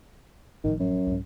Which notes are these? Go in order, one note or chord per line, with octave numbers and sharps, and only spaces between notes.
G#1 A2 D#3 F3
F#2
C2 G#2